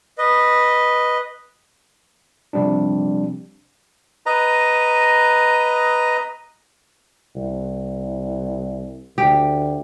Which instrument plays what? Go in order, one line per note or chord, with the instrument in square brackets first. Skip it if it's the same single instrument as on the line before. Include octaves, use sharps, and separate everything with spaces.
[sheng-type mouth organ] B4 D#5
[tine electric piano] C3 F3 G3 C4 D4
[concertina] B4 D#5 A#5
[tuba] C2
[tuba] D2 [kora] G4